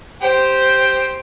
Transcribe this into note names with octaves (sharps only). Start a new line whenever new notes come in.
G4 C5 G5